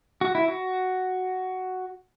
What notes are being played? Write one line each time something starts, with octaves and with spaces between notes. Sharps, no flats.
F#4
E4
F#4